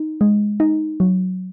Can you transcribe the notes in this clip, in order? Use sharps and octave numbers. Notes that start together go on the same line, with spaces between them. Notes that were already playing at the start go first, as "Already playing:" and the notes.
Already playing: D#4
G#3
D#4
F#3